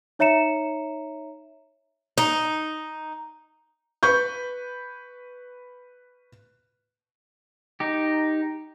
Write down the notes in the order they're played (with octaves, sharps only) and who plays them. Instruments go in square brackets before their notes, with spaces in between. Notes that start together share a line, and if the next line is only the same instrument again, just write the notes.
[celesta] D#4 C#5 E5 A#5 C#7 E7
[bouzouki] D#4
[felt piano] B4 C#6 G6
[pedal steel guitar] D#4 G4